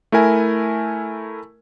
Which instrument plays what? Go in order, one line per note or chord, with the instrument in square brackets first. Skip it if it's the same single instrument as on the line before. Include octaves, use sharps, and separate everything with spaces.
[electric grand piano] A3 E4 A#4 G#5